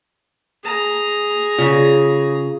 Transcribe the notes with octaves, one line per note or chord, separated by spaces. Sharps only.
G#4 A#5
C#3 F4